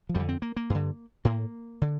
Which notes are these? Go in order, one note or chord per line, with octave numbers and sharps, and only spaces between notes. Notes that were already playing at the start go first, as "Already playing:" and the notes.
F3
F2 D3 G3
C4
A#3
A#3
G2 D3
A2 A#3
D3